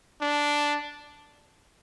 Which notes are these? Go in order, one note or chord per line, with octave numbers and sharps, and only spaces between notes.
D4